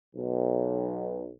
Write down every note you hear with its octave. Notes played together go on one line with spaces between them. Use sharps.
B1